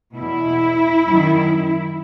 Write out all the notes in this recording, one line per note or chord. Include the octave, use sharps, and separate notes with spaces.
E2 B2 E4
F#2 D#3